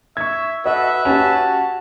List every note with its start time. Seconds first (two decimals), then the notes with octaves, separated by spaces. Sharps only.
0.17 E5 C#6 G#6
0.66 F#4 A4 B4 D#5 E5
1.05 C#4 F#4 G4 A5